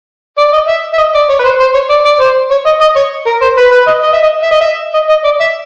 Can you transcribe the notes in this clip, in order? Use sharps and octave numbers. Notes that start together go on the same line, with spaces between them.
D5
D#5
E5
E5
D#5
D5
C#5
B4
C5
C5
C#5
D5
D5
C5
C#5
D#5
D#5
C#5
A#4
C5
B4
B4
D#5
D#5
E5
D#5
E5
D#5
E5
D#5
D#5
D5
E5